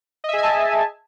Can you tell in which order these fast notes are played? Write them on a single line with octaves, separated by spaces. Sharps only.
D#5 E5 G#4 G#5 A5